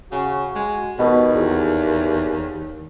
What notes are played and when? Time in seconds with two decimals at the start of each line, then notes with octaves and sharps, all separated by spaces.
0.11 C#3 F#4
0.55 G#3
0.98 D#2 B2
1.34 E2